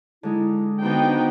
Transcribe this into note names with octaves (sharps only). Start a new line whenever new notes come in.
D3 G#3 D#4 E4
D3 B3 D4 D#4 F#4 C5 G5